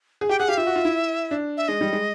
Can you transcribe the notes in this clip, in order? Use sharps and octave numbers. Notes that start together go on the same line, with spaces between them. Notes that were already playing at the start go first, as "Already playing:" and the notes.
G#4
G4 G5
G#4 F#5
G4 F5
F4 E5
F#4
F4
E4
D4
E5
G#3 D#5
G3
G#3